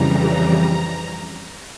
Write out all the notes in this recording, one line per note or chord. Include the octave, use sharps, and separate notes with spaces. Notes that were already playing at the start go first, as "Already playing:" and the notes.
Already playing: F2 C#3 E3 G3 A#5